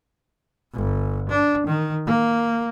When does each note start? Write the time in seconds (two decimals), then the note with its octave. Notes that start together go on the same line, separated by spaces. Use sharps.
0.74 G1
1.29 D4
1.67 D#3
2.06 A#3